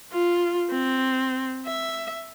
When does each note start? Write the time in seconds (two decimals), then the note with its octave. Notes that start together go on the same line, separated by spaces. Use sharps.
0.12 F4
0.70 C4
1.66 E5